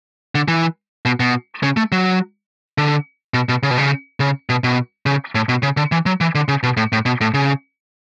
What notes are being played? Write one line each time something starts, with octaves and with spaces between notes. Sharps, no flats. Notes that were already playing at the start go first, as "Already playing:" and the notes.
D3
E3
B2
B2
C#3
A3
F#3
D3
B2
B2
C#3
B2
C#3
C#3
B2
B2
C#3
A2
B2
C#3
D3
E3
F#3
E3
D3
C#3
B2
A2
A2
B2
A2
C#3